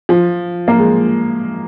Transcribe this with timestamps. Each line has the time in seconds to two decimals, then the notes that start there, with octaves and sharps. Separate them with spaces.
0.09 F3
0.68 A#3
0.78 G#3